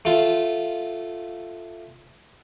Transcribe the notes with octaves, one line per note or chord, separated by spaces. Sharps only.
A3 F4